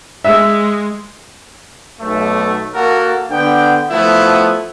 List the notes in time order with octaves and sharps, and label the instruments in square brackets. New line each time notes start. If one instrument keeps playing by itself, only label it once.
[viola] G#3 [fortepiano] E5
[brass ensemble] B1 A3
A#3 F#4 A4 A#4
D3 B3 G5
F3 A3 B3 E4